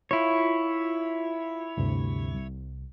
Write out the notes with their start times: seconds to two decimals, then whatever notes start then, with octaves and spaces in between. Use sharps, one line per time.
0.11 E4 F4 C#5
1.77 D2 G2 C3
2.34 C2